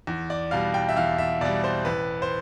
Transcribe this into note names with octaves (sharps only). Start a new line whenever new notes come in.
E2
D5
B2 G3 F5
G5
E5
E2 F5
E5
B2 G3 D5
C5
A1 B4
C5